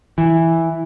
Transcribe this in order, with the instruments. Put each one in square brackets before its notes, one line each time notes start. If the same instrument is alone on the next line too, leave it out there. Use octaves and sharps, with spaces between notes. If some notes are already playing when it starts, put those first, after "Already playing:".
[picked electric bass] E3